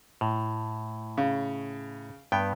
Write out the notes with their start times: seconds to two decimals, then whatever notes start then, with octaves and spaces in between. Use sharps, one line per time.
0.21 A2
1.18 C#3
2.32 G2 B3 G5